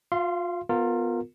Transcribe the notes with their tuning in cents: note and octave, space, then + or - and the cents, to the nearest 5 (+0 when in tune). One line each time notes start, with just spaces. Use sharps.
F4 +30 F5 -30 C6 +0
B3 +5 F4 +20 A#4 -20